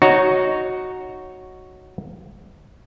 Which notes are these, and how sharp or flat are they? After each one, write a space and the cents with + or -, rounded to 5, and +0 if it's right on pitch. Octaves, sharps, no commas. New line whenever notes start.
D#4 -5 F#4 +0 C#5 +0